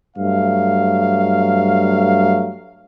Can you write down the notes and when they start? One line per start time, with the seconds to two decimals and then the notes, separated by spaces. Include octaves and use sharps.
0.17 G2 F#3 A3 F5